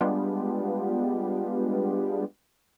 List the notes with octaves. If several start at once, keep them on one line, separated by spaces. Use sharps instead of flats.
G3 G#3 B3 D4 F4 G4